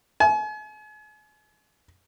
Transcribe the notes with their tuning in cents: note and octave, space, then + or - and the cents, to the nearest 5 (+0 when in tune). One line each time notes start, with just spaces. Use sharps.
G#5 +40